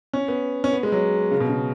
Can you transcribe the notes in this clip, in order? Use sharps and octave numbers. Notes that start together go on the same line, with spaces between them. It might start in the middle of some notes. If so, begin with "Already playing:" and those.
C#4
B3
C#4
B3
G#3
F#3
C#3
B2
C#3